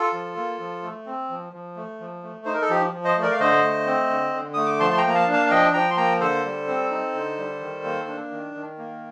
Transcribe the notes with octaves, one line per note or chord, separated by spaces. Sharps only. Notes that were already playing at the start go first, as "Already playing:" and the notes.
Already playing: F4 A4
F3
A#3
F3
A3
C4
F3
F3
A3
F3
A3
D#4 C5
A#4
A4
F3 G4
F3
C5 D#5
A3
A#4 D5
F5
D3 C5 D#5
A3
C4
D3
D3
A3 D#6
D6
F3 A5 C6
C6
G5 A#5
A#3
A#5
F5 A5
D4
F5 A5
F5
F3 D#5 G5
F3 G5 A#5
C6
A#3 G5 A#5
D3 A4 C5
G3
C4
D#4
D3
G3
D#3
A#3
D4
D#3
D#3
A#3